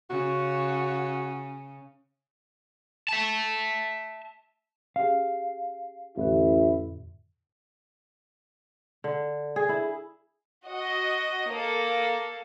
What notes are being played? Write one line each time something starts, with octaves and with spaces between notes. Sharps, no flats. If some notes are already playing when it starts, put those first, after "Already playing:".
C#3 F#4
E5 A5
C#4 G4 G#4 F5
A1 F2 A2 D3 E4
D3
G#4
E4
F#4 D#5
A#3 A4